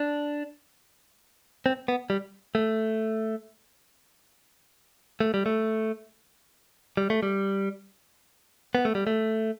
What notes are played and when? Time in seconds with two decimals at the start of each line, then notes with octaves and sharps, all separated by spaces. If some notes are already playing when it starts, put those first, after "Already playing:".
Already playing: D4
1.66 C4
1.88 B3
2.10 G3
2.55 A3
5.20 A3
5.34 G3
5.46 A3
6.97 G3
7.10 A3
7.23 G3
8.75 B3
8.85 A3
8.95 G3
9.07 A3